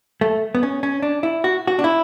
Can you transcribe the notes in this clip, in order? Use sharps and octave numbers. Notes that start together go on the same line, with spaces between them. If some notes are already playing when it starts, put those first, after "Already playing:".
A3
B3
C#4
C#4
D4
E4
F#4
F#4
D4
E4